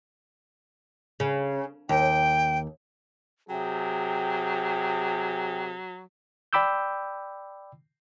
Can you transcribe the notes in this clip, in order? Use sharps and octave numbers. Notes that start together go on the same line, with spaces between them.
C#3
D#2 G5
C3 F#3 G#4 G5
D5 G5 B5 D6 E6 G6